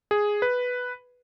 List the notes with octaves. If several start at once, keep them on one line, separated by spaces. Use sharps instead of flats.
G#4
B4